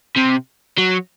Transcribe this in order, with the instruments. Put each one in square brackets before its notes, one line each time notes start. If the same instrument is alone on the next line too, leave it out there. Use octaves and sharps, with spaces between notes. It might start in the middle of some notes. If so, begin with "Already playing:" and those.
[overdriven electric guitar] C3
F#3